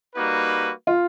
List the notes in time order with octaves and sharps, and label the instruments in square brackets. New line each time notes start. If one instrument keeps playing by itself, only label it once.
[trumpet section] G3 A#3 D#4 F#4 B4
[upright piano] F4